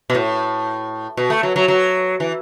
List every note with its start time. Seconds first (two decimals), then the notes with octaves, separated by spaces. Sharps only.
0.10 B2
0.15 A2
1.17 B2
1.30 A3
1.43 F#3
1.56 F#3
1.68 F#3
2.20 E3